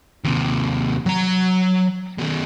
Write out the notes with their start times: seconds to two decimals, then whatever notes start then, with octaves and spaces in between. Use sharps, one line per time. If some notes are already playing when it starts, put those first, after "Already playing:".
0.25 D#2 C3
1.06 F#3 A#5
2.18 B2 D#3